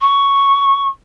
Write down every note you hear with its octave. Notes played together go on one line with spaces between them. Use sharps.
C#6